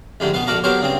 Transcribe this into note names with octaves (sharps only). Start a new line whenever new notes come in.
F2 G#2 D3 G3 A3
B2 B3 B4 F5
A#1 F#4 A4 D5 F5 A#5
F#3 B3 G4 A#4 C5 C#5
G2 C#3 C4